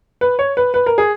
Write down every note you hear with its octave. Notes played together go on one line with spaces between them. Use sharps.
B4
C#5
B4
B4
A#4
G#4